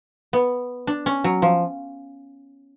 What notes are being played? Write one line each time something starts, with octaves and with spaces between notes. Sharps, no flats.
B3
D4
C#4
F#3
F3